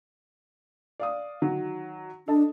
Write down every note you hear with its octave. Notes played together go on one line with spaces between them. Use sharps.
D5 F5 D#6
D#3 F#3
D4 A4 D#5 A5